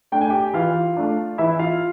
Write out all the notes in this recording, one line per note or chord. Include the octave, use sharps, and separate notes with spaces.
A3 D4 G5
G#5
G4 G5
E3 F4 F5
A3 D4
E3 E4 E5
F4 F5